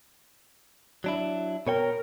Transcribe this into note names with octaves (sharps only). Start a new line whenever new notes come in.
F#3 D4 E4
B2 A#4 C#5 G5